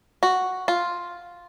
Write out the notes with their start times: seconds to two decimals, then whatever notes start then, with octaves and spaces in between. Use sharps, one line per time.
0.23 F#4
0.68 F4